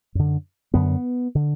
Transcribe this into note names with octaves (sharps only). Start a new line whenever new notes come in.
F#2 D3
F#2 D3 B3
D3